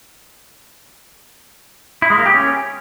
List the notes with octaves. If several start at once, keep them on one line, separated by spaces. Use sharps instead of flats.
E4
G#3
A#3
G4
C#4